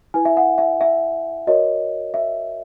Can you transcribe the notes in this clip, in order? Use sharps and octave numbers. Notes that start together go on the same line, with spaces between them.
E4 B4 G#5
E5
F#5
E5
E5
F#4 A#4 C#5 D#5
E5